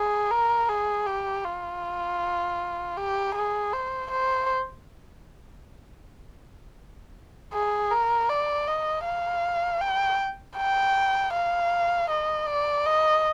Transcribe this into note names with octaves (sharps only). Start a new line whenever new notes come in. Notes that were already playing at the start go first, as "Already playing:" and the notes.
Already playing: G#4
A#4
G#4
G4
F4
G4
G#4
C5
C5
G#4
A#4
D5
D#5
F5
G5
G5
F5
D#5
D5
D#5